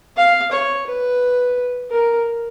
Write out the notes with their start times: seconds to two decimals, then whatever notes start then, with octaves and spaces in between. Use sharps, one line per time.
0.17 F5
0.51 C#5
0.86 B4
1.90 A#4